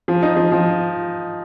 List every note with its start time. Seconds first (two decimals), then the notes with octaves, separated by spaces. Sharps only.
0.08 F3
0.23 D#4
0.36 F3
0.52 F3